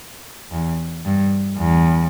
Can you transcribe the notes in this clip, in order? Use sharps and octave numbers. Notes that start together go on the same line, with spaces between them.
E2
G2
E2